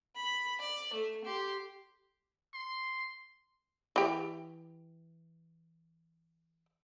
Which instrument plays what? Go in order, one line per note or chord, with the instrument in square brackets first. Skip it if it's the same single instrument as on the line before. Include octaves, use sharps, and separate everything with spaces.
[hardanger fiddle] B5
D5
A3
G4 C6
[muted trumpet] C6
[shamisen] E3 G4